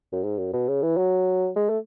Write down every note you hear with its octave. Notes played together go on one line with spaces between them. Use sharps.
F#2
G#2
F#2
B2
C#3
E3
F#3
G#3
A3